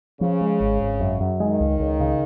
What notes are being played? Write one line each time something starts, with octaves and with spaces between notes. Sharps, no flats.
C#3 F3
G#3
G#1
G#1
F#2
F#2
D#3 G#3
C#2
C#2
C#3